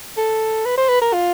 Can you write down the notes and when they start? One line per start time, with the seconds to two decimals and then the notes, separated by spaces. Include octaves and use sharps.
0.17 A4
0.65 B4
0.78 C5
0.89 B4
1.02 A#4
1.13 F4